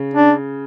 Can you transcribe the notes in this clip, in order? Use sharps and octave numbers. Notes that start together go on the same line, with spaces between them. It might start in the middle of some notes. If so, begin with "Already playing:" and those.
Already playing: C#3
D4